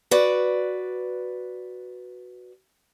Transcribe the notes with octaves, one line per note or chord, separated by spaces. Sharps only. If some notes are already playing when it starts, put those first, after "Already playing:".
F#4 B4 D5